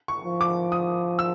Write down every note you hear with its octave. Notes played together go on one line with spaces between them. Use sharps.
C#6
F3
D6
D#6
E6